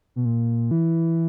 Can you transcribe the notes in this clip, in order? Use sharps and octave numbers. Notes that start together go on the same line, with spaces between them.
B2
A#2
E3